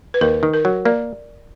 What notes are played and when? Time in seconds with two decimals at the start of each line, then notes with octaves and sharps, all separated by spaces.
0.14 B4
0.21 D#2 A#4
0.43 D#3
0.54 A#4
0.65 F#3
0.85 A#3 D5